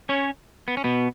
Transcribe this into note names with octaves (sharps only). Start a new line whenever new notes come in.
C#4 C#5
B3
C#4
B2 B3